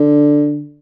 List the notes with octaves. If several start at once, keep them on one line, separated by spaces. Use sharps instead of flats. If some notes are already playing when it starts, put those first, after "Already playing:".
Already playing: D3